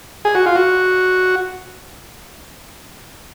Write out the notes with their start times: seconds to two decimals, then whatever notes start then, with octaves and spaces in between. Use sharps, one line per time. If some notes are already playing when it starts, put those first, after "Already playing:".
0.25 G#4
0.35 F#4
0.46 F4
0.55 F#4